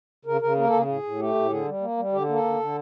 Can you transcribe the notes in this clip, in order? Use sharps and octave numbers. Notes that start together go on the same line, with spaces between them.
C#3 A#4
C#3 A#4
A#3 A#4
A4
C#3 G#4
A2 G#4
A2
A3 G4
A2
D3 G#4
G3
A#3
G3
D3 G4
A#3 A4
D3
D3